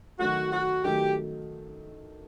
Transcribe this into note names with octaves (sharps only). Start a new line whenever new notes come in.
D#3 F#3 A3 F#4
F#4
D#3 F#3 A3 G4